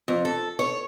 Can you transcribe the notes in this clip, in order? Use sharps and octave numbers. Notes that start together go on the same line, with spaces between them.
F2
A4
C#5